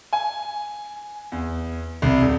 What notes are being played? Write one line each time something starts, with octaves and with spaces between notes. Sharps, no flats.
G#5
E2
C2
D#1